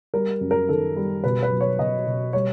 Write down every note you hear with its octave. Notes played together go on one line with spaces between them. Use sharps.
G3 A#4
F#2
A#4
D#3 A4
G3
B2 B4
B4
F#3
C#5
B2 D#5
B2
G3 C#5